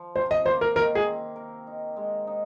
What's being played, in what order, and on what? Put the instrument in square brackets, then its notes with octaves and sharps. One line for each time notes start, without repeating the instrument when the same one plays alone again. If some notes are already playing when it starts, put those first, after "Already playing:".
Already playing: [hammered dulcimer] F3
[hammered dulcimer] C3 [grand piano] C5
[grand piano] D#5
[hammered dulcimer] A#3 [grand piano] C5
[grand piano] A#4
[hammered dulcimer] D#3 [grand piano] A#4
[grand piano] G#4
[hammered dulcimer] C4
A#4
D#4
G#3
D#4